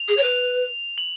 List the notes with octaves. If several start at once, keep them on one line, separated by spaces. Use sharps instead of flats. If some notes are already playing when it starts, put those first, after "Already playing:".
Already playing: F7
G#4
C#5
B4
F#7